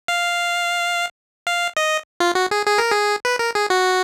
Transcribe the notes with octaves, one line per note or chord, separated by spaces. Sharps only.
F5
F5
D#5
F4
F#4
G#4
G#4
A#4
G#4
B4
A#4
G#4
F#4